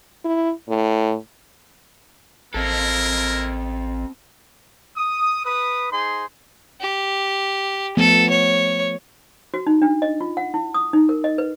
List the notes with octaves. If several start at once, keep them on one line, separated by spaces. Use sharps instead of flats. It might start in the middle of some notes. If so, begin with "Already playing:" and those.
E4
A2
A1 A#3 C4 E4 A4 A#4
D#6
B4 D#6
D#4 G#4 C5 C6
G4
F3 A3 B3 A4
C#5
F#4
D#4
D4
D#5
F4
F#5
E4
D#6
D#4
A#4
D#5
B4